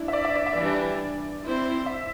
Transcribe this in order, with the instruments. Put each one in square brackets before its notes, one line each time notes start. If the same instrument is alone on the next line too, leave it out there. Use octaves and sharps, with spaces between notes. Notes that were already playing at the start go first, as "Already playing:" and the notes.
Already playing: [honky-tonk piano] D4 E4
E5
D5
E5
D5
E5
[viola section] E3 G3 D4 [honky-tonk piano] D5
[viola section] C4 E4 C5
[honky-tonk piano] E5